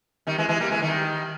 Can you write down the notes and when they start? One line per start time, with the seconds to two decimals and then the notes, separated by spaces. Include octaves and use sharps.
0.27 D#3 G3
0.38 E3 G#3
0.49 E3 G#3
0.60 G3 A#3
0.71 E3 G#3
0.82 D#3 G3